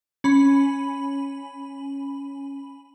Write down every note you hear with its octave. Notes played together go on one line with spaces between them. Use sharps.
C#4 B5